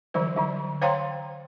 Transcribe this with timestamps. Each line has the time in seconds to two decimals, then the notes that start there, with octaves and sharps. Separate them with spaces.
0.14 D3 E3 F#3 G3 C5
0.36 D3 F#3 G3
0.82 C5 C#5 F5 G5 A#5 C6